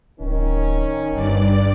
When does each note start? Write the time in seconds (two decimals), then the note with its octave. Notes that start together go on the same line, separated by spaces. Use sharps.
0.20 D1 D#3 C#4
1.12 G1 G2 D5